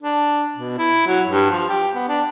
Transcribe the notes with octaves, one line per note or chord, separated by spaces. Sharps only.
D4
B2
E4
F#3
G2
F3
G4
B3
D4